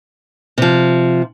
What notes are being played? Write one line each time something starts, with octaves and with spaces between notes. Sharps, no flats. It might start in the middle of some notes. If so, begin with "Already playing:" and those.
C3 F3